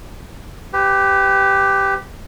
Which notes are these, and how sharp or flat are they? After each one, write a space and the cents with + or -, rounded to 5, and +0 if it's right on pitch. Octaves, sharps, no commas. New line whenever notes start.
G4 +0 B4 +35